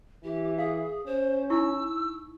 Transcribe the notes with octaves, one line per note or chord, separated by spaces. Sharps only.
E3 G4
G#4 F5
C#4 C5
D#4 E4 C#6 E6